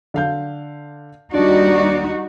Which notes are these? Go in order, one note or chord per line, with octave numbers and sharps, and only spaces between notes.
D3 F5 G6
D#2 G3 D4 D#4 F#4 D5